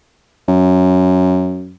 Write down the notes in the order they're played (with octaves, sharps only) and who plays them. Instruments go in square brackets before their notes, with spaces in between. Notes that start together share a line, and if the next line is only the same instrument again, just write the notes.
[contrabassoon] F#2